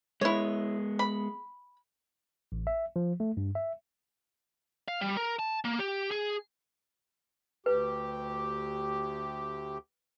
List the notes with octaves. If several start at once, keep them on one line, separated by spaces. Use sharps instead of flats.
G#3 B3 E4 C#5
B5
A1
E5
F3
A3
G2
E5
F5
G3
A#4
A5
A#3
G4
G#4
D2 G4 B4